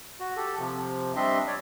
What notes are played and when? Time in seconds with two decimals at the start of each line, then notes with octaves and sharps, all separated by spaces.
0.20 F#4
0.37 G4 A4
0.59 C3 F3
1.16 G3 C4 D4 D#5 E5 C6
1.48 C#5 D5